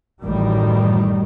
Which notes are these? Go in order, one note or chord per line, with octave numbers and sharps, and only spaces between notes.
A1 F#2 D#3 G3